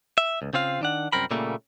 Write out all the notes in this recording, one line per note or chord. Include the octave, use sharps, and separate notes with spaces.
E5
C#2
C#3 C4 F4 F5
D#3 D4 F#5
C2 F#2 C4 A#4 B5
A#2 C#3 G3 A3 A#3